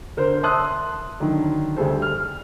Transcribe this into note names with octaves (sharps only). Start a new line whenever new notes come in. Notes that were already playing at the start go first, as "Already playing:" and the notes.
D3 A#4 C5
E5 A5 C6 D#6 E6 F#6
D3 D#3 F#3
D2 G3 G#4 A4 C5
F6